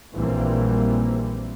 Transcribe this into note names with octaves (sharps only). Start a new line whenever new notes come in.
A#1 A#2 E3 G3 A#3 C4